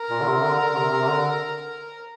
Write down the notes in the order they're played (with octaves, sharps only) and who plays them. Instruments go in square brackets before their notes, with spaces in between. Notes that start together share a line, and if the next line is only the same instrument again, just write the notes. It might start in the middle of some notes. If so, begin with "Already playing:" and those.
Already playing: [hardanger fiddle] A#4
[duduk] A#2
D3
C3
D3
D3
C3
C3
C3
D3